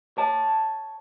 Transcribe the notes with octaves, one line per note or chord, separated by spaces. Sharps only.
C#5 A5